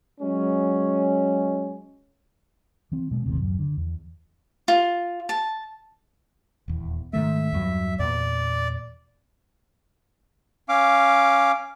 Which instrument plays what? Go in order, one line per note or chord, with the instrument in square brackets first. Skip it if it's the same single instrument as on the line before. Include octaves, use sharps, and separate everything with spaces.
[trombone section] F#3 G#3 C#4
[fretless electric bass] E3 C4
B2 G#3
G#1 D#2 A2 C3
D1 F#2
D3
E2
[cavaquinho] F4
A5
[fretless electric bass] D#1 E2
[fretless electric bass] G#2 D#3 A3 [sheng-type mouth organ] E5
[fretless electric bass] E2 G2 F#3
[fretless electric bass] E2 A#2 [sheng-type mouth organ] D5
[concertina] C#4 F5 D6